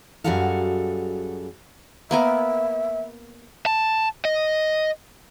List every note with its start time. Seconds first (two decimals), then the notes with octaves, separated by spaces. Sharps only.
0.24 F#2 G3 F#4 G#4 A4 F5
2.11 A#3 B3 A#4 E5
3.66 A5
4.25 D#5